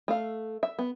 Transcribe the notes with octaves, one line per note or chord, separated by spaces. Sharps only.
A3 F5
E5
B3